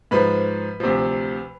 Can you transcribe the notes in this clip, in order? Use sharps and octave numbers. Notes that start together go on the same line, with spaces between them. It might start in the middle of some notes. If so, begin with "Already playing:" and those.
G#2 F3 B4
D2 C3 F3